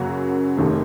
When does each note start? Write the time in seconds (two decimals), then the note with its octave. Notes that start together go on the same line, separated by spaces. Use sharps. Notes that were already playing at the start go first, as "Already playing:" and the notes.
Already playing: F#2 C#3 F#3 A#3 F#4
0.57 F1 D#2 D#3 A3